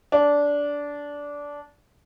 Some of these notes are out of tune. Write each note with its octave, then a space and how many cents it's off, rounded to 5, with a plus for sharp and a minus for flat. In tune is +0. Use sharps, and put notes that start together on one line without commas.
D4 -15